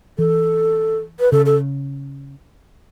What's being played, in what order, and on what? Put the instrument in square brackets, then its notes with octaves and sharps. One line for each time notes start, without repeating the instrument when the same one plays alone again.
[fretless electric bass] E3 [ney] A4
[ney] B4
[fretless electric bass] C#3 [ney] A4
[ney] A4